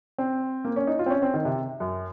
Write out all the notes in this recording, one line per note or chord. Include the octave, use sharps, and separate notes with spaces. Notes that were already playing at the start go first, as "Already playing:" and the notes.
C4
A#3
C#4
D#4
F4
C4
C#4
C4
D#3
C3
F#2